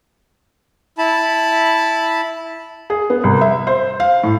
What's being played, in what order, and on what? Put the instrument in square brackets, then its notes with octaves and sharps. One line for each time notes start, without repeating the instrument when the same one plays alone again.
[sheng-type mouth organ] E4 A5 B5
[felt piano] G#4
B3
C2
E5
C5
F5
A2